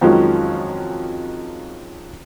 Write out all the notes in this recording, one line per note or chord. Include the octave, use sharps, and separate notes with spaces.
F2 D#3 F3 F#3 G#3 C#4